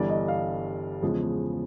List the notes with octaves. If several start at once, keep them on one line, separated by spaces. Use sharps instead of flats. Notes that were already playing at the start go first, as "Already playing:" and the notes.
Already playing: G1 G2 E3 G3 D5
D#5
F5
E2 C#3 F3 G#3